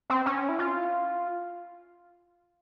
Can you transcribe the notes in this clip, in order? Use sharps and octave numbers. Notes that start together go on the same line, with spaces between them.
C4
C#4
E4
F4